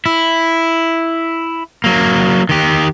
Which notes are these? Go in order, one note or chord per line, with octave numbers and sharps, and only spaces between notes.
E4
F#3 A#3
D#3 G4